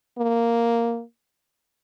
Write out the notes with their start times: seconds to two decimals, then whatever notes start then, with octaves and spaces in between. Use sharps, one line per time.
0.18 A#3